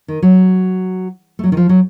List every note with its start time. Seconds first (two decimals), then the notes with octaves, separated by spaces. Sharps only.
0.08 D#3
0.22 F#3
1.39 A3
1.44 F#3
1.52 D#3
1.57 F3
1.69 F#3